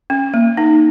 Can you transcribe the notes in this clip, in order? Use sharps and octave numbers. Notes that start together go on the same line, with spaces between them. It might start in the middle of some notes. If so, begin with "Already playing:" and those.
C#4
A#3
D#4